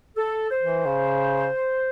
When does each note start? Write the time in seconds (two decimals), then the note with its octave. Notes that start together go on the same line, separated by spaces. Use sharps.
0.16 A4
0.51 C5
0.62 E3
0.86 C#3